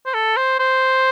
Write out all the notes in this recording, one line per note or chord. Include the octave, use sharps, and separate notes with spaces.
C5
A4
C5
C5